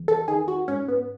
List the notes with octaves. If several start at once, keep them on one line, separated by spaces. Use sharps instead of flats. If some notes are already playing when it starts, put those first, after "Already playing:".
Already playing: E2
A4
D#3 G#4
F#4
G#2 C#4
B3